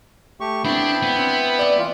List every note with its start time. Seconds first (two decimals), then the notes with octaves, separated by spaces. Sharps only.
0.41 A3 G4 C#6
0.65 B3 C4 D4 E4 G5 B5
1.02 B3
1.19 C4
1.59 D5 E5
1.79 E3 F4